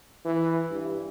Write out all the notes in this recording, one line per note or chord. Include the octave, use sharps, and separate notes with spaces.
E3
G2